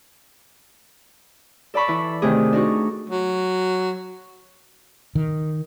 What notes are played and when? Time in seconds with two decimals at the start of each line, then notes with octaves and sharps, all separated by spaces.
1.74 A4 D5 A5 B5 C#6
1.88 E3 E4
2.22 C3 D#3 A3 C4 G4 G#4
2.53 D4 D#4 F#4 C#6
3.10 F#3
5.15 D#3